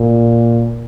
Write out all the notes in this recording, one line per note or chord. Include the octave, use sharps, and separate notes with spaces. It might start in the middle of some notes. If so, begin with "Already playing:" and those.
Already playing: A#2